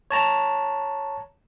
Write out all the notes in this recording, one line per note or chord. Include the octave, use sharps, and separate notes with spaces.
C#5 A5 A#5